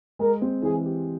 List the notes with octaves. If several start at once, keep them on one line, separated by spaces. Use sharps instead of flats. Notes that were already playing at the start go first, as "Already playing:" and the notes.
G#3 A#4
C4
E3 G#4
G4